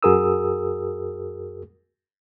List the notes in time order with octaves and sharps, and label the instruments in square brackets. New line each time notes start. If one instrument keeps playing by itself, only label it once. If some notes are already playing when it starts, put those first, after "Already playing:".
[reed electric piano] F#2 F#4 G#4 A#4 D#6 E6